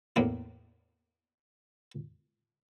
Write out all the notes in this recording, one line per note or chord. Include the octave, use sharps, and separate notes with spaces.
E2 A2 A#3 D4